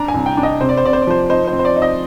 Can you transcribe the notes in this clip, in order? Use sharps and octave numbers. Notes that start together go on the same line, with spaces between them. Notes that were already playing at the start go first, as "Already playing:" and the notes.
Already playing: D4 A#5
G#5
C2
G5
D4
D#5
C3 C5
D5
C5
C3 D5
C5
D5
F3 C5
D#4 C5
C5
C4
C5
D5
D#4
D#5